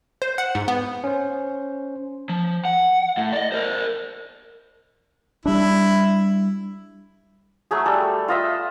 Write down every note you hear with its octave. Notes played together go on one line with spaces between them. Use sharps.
C5
F#5
G#2
B3
C#4 C5
F3
F#5
A2
D5 D#5
A#4 C5
G3 D4 E4
F#3 A3 G#4
G3 A4
F4 D#5 E5